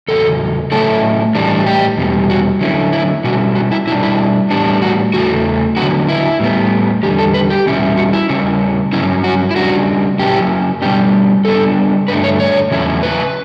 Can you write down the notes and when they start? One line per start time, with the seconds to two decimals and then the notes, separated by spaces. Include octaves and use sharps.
0.08 E2 C#3 F#3 A4
0.72 A2 F#3 A3 C#4 E4 A4
1.35 A2 E3 G3 D4
1.66 G4
1.98 E2 B2 G3
2.30 F#4
2.61 D3 F#3 C#4 E4
2.93 E4
3.24 B2 G3 C#4 E4 F#4
3.55 F#4
3.71 E4
3.87 B2 G3 D4 E4
4.03 E4
4.50 A2 E3 G3 B3 D4
4.82 F#4
5.13 E2 C#3 E3 A3 F#4
5.77 D3 F#3 B3 F#4
6.09 E4
6.40 A2 G3 B3
7.03 E2 D3 G3 G4
7.18 A4
7.34 B4
7.50 G4
7.66 E2 B2 G3 C#4 E4
7.97 F#4
8.13 E4
8.29 C#3 G3 C#4 E4
8.93 G2 F#3 C#4 E4
9.24 F#4
9.51 E4
9.56 C#3 G3 D4 F#4
10.19 F#2 C#3 F#3 C#4 E4 G4
10.82 B2 G3 B3 D4 G4
11.45 C#3 G3 B3 D4 A4
12.08 G2 D3 A3 D4 B4
12.24 C#5
12.40 C#5
12.71 E2 C#3 F#3 C#4 E4
13.03 B4